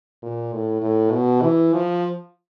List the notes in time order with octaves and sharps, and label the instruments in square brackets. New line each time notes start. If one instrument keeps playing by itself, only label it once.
[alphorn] A#2
A2
A2
B2
E3
F3